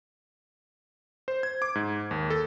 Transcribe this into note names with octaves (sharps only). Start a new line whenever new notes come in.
C5
G#6
D6
G#2
D#2
A4